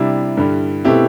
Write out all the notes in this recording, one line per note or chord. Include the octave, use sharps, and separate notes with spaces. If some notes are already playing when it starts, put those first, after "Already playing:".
Already playing: C3 G3 D4 E4
G2 D3 G3
B2 A3 C4 E4 G4